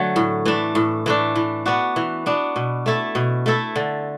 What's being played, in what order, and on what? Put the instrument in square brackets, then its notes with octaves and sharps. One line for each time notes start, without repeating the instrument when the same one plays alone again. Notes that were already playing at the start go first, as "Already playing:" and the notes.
Already playing: [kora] D3 F#3 A3
A2
E3 A3 D4
A2
E3 A3 D4
E3
B3 D4 F#4
E3
B3 D4 F#4
B2
A3 E4 A4
B2
A3 E4 A4
D3